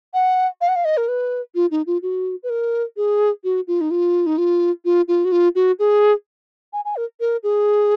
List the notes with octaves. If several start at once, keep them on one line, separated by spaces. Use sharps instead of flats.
F#5
F5
F#5
F5
D#5
A#4
B4
F4
D#4
F4
F#4
B4
A#4
G#4
F#4
F4
D#4
F4
D#4
F4
F4
F4
F#4
F4
F#4
G#4
G#5
G#5
A#4
A#4
G#4